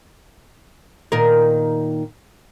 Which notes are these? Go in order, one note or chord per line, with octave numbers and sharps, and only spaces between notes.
A#2 D#3 A#4